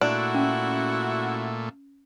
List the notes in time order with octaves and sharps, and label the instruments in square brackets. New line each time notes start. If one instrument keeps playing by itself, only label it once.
[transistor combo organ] A#2 A3 [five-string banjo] D4 [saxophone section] E4 F#4
[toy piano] C#4